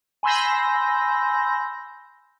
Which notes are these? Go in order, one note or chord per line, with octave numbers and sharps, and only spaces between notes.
G#5 B5 C6 E6 G6 A#6